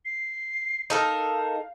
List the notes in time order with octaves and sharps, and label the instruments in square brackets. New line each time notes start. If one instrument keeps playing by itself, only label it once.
[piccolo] C7
[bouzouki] D#4 A4 A#4 [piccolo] F5